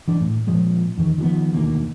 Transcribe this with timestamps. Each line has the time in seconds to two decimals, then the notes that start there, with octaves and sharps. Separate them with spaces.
0.08 E3 D4
0.21 A2
0.47 A#2 F3 G#3
0.98 E2 D#3
1.18 D#3 F3 G3 B3
1.53 E1 D2 D#3 A#3